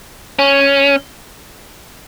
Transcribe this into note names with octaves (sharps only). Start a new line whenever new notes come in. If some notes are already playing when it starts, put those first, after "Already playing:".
C#4